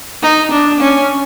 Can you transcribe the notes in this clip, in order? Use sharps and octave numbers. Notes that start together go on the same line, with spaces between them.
D#4
D4
C#4